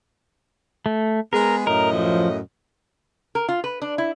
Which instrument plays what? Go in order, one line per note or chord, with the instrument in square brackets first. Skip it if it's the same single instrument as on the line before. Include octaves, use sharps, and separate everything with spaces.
[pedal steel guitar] A3
[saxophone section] G#3 B3 G#4 [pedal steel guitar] A#4
[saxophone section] F#2 A2 D#5 [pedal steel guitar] A#4
[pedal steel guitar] F3
[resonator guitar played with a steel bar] A#4
F4
B4
D4
E4